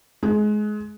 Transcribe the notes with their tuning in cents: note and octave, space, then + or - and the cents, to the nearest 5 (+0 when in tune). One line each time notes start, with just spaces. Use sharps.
G#3 +25